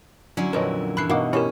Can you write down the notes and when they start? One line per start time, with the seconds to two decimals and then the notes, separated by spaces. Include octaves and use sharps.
0.37 D3 F#3 C#4 E4
0.53 F2 A#2 D4 A#4 B4 C#5 D#5
0.97 G2 E3 B5 F#6 C7
1.09 B2 B3 D#4 F#4 A#4 F5 D6
1.33 C#4 E4 G4 A#4 C#5